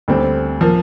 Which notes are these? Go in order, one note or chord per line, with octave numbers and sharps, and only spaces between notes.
D2 D3 G3 C4
F3 A#3